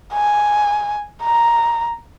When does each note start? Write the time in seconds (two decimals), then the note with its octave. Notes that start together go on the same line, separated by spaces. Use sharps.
0.14 G#5
1.23 A#5